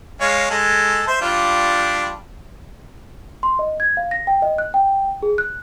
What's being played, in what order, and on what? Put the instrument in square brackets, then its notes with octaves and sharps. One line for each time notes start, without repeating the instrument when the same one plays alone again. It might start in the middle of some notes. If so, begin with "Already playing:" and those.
[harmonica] G#3 C#5 F5
G#3 A4
C5 E5
G3 D4 F4
[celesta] C6
D#5
G#6
F5
A#6
G5
D#5
F#6
G5
G#4
F#6